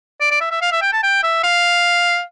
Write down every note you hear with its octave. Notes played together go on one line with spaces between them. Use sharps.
D5
D5
E5
E5
F5
E5
G5
A5
G5
E5
F5